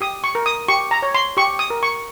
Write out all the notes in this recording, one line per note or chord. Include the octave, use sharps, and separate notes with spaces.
G4 D#6
C#6
A#4
D#6
G4 C#6
A#5
C#5
C6
G4 C#6
D#6
A#4
C#6